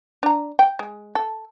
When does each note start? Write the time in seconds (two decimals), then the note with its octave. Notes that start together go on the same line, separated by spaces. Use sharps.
0.23 D4 A#5
0.59 G5
0.79 G#3
1.15 A4